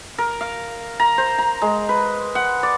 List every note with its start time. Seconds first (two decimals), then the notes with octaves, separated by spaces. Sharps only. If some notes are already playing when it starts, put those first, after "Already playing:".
0.18 A#4
0.41 F5
1.00 A#5
1.18 C5
1.38 A#5
1.62 G#3
1.89 B4
2.35 F#5
2.63 D5